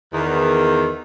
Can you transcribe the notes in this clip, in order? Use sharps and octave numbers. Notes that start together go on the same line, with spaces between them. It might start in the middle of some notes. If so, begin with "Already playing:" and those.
E2 D#3